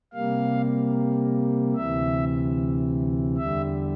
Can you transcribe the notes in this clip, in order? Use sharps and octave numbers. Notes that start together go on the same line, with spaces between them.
C3 G3 A#3 F5
D2 C3 E3 E5
E2 D3 G3 E5